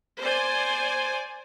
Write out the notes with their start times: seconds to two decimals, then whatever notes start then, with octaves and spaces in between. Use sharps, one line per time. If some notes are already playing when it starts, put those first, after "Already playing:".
0.20 C5 D5 G#5